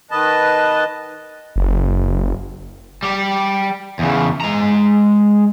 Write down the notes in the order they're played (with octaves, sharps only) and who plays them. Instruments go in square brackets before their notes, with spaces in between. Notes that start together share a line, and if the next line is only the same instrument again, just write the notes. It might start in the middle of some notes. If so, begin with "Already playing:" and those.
[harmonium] D#3 B4 D#5 A5
[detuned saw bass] F#1
[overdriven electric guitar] G3 G4
E2 C#3
G#3 A#5